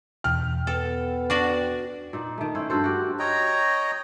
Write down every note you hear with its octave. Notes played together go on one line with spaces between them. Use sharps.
E2 B2 G5 F6
B3 A4
D4 F#4 D5
A#2 D#4
D#3 A3
C#4 E4 C5
G2 F#4 A4 C5
F#4 G4
C#5 D#5 G5 A#5